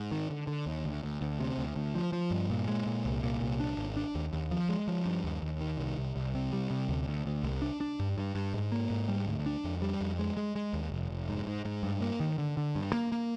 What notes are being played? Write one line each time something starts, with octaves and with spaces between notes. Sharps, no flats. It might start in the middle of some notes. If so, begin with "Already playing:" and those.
Already playing: G#2
D#3
D3
D3
D#2
D2
D2
D2
C3
D2
D2
F3
F3
G2
A#2
G#3
A#2
C2
A#2
C2
D4
G#1
D4
D#2
D#2
F3
G#3
F3
G2
D#2
D#2
D#3
C2
C2
C2
C3
G3
C3
D2
D2
D2
C2
D4
D4
G2
G2
G2
G#2
A#3
G#2
G3
D2
D4
F2
G3
F2
G#3
G#3
G#3
D#2
F1
F1
G#2
G#2
G#2
G2
A#3
D#3
D3
D3
G2
A#3
A#3